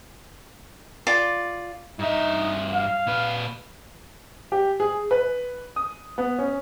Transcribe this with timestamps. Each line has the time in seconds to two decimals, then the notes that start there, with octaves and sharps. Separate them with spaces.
1.07 F4 D5
1.99 G2 D#4 E5
2.73 F5
3.07 A#2 B4
4.52 G4
4.80 G#4
5.11 B4
5.76 D#6
6.18 B3
6.39 C#4